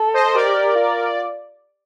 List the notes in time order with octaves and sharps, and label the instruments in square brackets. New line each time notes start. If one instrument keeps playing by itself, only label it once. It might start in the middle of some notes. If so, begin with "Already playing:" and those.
Already playing: [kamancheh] A4
[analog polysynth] C5 D#5
[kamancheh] G4 [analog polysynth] A#4 D5
[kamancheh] F4